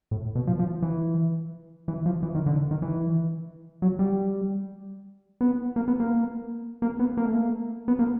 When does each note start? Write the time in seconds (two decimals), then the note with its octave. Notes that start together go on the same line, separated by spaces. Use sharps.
0.11 A2
0.35 B2
0.47 F3
0.59 F3
0.82 E3
1.88 E3
2.06 F3
2.23 E3
2.35 D#3
2.46 D3
2.71 D#3
2.82 E3
3.82 F#3
3.99 G3
5.41 B3
5.76 A#3
5.88 B3
6.00 A#3
6.82 A#3
6.99 B3
7.17 A#3
7.25 A3
7.34 A#3
7.88 B3
7.99 A#3